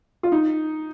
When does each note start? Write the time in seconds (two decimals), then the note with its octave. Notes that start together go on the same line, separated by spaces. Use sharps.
0.23 F4
0.32 D#4